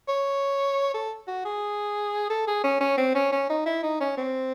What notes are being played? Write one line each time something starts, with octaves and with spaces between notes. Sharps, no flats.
C#5
A4
F#4
G#4
A4
G#4
C#4
C#4
C4
C#4
C#4
D#4
E4
D#4
C#4
C4